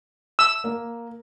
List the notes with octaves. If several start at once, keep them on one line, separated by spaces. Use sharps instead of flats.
E6
A#3